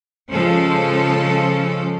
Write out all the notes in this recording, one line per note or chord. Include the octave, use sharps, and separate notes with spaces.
C#3 F3 G#3 C#4 A4 C5